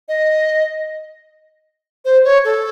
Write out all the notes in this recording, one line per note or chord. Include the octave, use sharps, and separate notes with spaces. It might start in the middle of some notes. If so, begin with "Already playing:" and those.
D#5
C5
C#5
A4